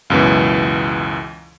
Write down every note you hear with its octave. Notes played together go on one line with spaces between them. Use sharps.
C#2 F#2 B2 E3